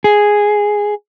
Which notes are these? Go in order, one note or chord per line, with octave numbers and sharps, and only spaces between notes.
G#4